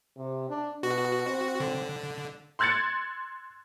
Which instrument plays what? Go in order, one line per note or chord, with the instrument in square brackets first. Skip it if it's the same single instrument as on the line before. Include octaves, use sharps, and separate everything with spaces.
[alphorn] C3
D4
[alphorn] B2 [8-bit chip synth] F#4
[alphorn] C4
[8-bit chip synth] D3
[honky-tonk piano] C6 E6 F#6 G#6 A6 C#7